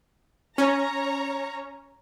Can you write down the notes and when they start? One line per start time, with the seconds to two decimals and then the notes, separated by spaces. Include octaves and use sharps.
0.58 C#4 C#5 A#5